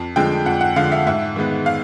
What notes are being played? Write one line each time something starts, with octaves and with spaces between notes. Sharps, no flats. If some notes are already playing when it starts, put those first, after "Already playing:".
Already playing: F2
D3 F3 G#3 G5
F2 F#5
F#5
D3 F3 G#3 F5
E5
G#2 E5
D#3 G#3 B3
F5